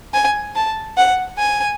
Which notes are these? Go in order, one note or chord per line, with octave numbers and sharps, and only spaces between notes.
G#5
A5
F#5
G#5